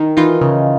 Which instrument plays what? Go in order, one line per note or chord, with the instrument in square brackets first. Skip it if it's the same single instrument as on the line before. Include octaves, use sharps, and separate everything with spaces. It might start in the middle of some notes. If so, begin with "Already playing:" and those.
Already playing: [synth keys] D#3
E3 D#4 F4
C#3